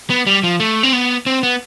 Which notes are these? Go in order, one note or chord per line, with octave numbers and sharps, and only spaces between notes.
B3
G3
F3
A3
C4
B3
C4
B3